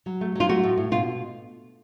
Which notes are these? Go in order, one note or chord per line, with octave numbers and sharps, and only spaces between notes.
F#3
A3
F#3 F4
A3 F#4
A2
A2
B2 F4